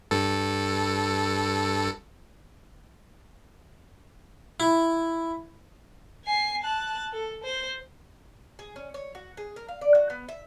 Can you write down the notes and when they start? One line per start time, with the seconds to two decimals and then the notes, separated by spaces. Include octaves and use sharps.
0.11 G2 A4
4.60 E4
6.26 G#5 C7
6.63 A5 F#6
7.12 A4
7.44 C5
8.59 G#4
8.76 C#4
8.94 C#5
9.15 F#4
9.37 G#4
9.56 A#4
9.68 F5
9.81 D5
9.95 F#4
10.10 B3
10.29 E5